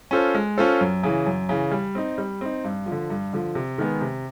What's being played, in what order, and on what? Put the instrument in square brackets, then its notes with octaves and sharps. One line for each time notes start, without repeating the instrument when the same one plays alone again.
[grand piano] C#4 F4 A4 C5
G#3
C#4 F4 A4 C5
F#2
C#3 E3
F#2
C#3 E3
G3
C4 D#4
G3
C4 D#4
G2
F3
D3
G2
D3 F3
C3
D#3 G#3 B3
C3